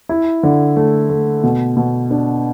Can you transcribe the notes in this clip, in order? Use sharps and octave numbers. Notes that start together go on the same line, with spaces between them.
E4
D3
A3
A3
B2
B2
D4